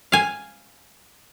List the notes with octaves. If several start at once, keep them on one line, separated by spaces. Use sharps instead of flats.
F5 G#5